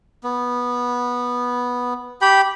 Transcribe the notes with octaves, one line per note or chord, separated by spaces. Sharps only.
B3
G4 G5 B5